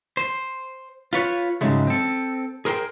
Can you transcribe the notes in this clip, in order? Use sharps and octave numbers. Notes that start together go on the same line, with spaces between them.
C5
F4 B4 C#5
G#2 C#3 F#3 G#3 A3
C4 A4
G#4 A#4 C5 G5